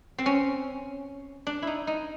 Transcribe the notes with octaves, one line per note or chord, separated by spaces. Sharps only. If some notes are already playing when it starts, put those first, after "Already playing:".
C4
C#4
D4
D#4 E4
D#4